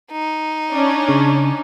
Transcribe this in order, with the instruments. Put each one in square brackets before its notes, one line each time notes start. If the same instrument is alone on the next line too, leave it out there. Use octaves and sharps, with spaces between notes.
[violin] D#4
[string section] C#4 D4
[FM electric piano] C#3